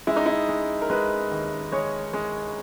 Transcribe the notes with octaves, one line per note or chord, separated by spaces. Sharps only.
G#3 E4
D#4
E4
G#3
A#4
G#3 B4
D#2
G#3 C#5
G#3